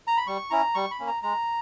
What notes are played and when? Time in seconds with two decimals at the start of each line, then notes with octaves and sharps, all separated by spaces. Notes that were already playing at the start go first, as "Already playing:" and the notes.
0.08 A#5
0.17 B5
0.27 G3 C#6
0.50 C#4 E4 A#5
0.75 G3 C#6
0.91 B5
1.00 A#3 C#4
1.07 A#5
1.23 G#3 A#5